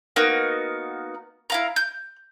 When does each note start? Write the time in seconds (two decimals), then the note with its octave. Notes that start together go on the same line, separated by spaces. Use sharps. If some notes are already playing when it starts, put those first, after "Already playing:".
0.16 A#3 B3 D#4 F#4
1.50 E4 F5 A#5
1.76 G6